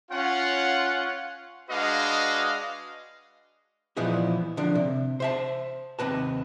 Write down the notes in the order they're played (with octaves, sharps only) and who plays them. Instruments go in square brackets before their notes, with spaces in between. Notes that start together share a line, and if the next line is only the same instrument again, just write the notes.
[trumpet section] C#4 F4 F#5
G#3 D4 F#4 B4 D#5 F5
[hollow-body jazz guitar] A#2 E3 F3 B3 D#4 E4
D3 F3 D4
C3
C5 E5 A5
D#2 C3 B4 A5